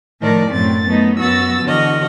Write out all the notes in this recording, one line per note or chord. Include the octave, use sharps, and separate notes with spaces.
A2 D#3 F3 A#4 D5 A5
F#2 A2 F#3 C4 A6
F#3 A3 B3 D#4
F#2 B3 F#4 E6 A6
D3 E3 F#4 D#5 F6